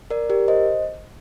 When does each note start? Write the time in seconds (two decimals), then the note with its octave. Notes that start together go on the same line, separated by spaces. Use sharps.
0.10 A#4 D5
0.30 G4 A#4
0.48 C5 D#5